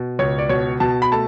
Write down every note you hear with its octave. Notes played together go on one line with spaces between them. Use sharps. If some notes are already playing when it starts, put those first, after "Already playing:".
Already playing: B2
C#2 C#5
D5
B2 C#5
B2 A5
B5
A3 A5